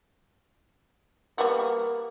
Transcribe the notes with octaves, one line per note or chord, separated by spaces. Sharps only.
G3 A#3 B3 F#4